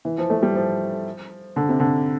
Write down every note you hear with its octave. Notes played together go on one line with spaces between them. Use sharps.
E3
F3
A3
G3
F3
D3
C3
D3